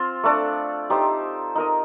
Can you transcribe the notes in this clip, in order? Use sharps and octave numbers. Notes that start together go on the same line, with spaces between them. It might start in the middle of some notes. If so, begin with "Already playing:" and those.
Already playing: C4 F4 C5
A3 D4 A4 D5
D#4 G4 C5
D#4 A#4 D#5